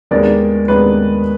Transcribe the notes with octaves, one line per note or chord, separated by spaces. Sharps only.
D#2 D#3 G#3 B3 D4 D5
D#2 D#3 G#3 B3 D4 B4